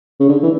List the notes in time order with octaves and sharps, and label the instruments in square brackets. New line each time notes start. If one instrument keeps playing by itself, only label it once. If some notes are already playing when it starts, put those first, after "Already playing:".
[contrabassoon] C#3
D3
E3